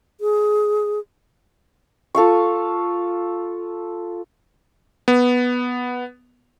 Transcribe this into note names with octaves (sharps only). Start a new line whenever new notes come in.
G#4
F4 A4 F5 C#6
B3